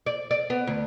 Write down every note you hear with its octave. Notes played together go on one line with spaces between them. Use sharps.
D5
D5
B3
D2